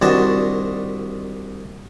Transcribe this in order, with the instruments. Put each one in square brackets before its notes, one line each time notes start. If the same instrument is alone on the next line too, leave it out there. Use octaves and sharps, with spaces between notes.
[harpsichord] C2 D#3 D4 F#4 D#5 A5